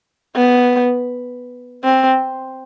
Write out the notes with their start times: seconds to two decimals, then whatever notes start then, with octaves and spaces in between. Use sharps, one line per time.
0.36 B3
1.84 C4